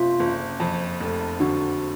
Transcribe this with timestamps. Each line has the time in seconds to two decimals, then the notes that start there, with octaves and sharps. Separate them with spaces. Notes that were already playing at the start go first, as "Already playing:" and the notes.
Already playing: F#1 C3 F4
0.20 F#1
0.60 F2
1.00 F1
1.40 D3 F#4